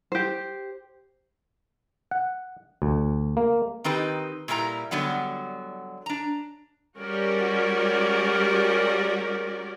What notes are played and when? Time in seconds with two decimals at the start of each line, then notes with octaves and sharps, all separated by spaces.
0.12 G4 C5
2.11 F#5
2.82 D2
3.37 A#3
3.84 D#3 C4 D#4 G4 B4
4.48 A#2 G3 E4 A4 A#5
4.91 D3 F#3 G3 B3 F#5
6.06 D4 A#5
6.99 G3 G#3 C#4 F#4 A#4 D5